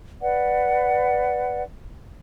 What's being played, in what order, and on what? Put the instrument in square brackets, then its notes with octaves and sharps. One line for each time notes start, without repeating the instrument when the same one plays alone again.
[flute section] B4 D5 F#5